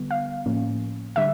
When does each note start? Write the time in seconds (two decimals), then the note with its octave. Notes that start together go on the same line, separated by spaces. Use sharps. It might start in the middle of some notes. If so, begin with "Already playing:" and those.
Already playing: D3 G3 B3
0.11 F5
0.46 A2 F3 A#3 C#4
1.16 D3 G3 E5